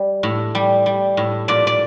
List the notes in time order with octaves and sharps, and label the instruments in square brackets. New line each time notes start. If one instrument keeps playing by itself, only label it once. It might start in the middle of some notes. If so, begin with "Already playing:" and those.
Already playing: [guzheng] G3
A2
G3
G3
A2
A#2 D5
D5